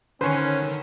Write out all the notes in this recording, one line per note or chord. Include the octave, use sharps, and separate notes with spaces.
D3 D#3 C#4 B4 C5